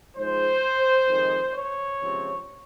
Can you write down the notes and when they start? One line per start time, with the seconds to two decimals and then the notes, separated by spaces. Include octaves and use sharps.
0.17 G#2 F3 G#3 C5
1.08 F2 D#3 G#3
1.55 C#5
2.00 C#2 C3 F3 C4